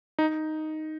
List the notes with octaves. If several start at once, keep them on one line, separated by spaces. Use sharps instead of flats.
D#4